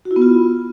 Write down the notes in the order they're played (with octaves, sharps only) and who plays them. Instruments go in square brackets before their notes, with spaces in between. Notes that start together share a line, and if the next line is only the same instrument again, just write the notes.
[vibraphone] F#4
E4
B3
F4